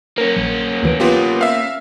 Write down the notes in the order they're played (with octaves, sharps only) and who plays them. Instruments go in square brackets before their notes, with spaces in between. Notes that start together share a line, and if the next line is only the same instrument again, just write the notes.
[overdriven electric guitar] A#3 C#4 [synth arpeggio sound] A#4
[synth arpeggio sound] A#1
D2 E3 D7
[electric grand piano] B3 F4 G4
E5 F5